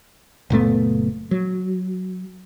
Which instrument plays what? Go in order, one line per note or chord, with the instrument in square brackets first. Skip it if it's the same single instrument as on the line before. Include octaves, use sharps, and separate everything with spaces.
[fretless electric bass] F#1 A#2 A3 B3
F#3